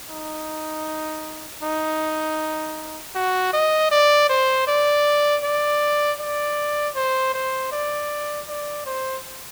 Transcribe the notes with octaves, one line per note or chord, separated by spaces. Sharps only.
D#4
D#4
F#4
D#5
D5
C5
D5
D5
D5
C5
C5
D5
D5
C5